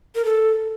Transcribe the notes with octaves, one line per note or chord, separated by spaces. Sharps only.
A#4
A4